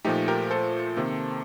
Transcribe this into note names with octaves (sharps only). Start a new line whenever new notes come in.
A#2 F3 A3 D#4 G4
G4 A#4
A4 C5
C3 D#3 A#3